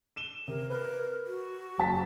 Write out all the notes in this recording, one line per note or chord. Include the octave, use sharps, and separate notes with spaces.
D#7 E7 G7
C3 A#4
A#4 B4
F#4
F#1 A5 B6